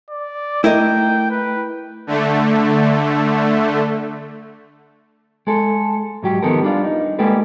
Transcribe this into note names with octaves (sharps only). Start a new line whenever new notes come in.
D5
A3 E4 A#4 D#5 G5
B4
D3 A3
G#3 A4
G#2 F#3 G4
D#3 F3 B3 G4 A4 A#4
G3 D4 F4
D#4
G3 G#3 A#3 G4 A4 B4